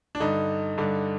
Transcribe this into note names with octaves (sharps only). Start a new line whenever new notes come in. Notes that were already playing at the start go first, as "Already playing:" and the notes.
D4
G2 D3 D#4
G2 D3